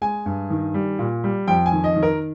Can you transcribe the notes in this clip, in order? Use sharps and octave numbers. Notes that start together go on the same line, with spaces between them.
G#3 G#5
G2
D#3
G3
A#2
G3
F2 G5
G#5
D#3
D#5
D#3
A#4